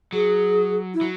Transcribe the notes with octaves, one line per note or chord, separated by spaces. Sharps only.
F#3 G#4
E4
F#3